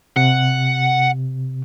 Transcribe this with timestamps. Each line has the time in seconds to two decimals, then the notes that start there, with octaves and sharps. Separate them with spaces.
0.16 C3 F#5